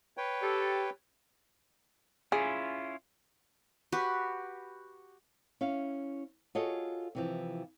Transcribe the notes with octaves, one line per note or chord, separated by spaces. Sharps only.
B4 C#5 G5
G4 A4
C#4 E4 F4 G#4
F#4 G4 B4
C#4 E4 F5
F4 F#4 G#4 A4 C#5 D#5
C3 E3 F3